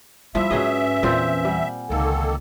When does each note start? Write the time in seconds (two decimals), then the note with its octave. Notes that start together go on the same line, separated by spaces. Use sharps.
0.35 F3 G3 D#4 E4 E5 B5
0.51 G#2 F#3 C#4 D4 G#4 B4 D#5 G#5
1.03 E2 A#2 E3 C4
1.45 G3 F#5 G#5
1.90 C#2 D3 D#3 A#3 A4